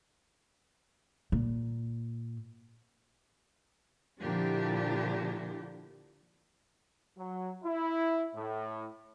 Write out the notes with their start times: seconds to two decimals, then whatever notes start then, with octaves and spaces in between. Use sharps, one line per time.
1.32 A#2
4.21 A#2 D3 F3 D4 E4 G4
7.18 F#3
7.64 E4
8.35 A2